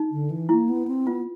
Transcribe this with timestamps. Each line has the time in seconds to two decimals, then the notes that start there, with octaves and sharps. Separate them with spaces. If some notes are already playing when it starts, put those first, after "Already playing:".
Already playing: D#4
0.12 D3
0.30 E3
0.49 A#3 E4
0.69 B3
0.88 C4
1.07 B3 F4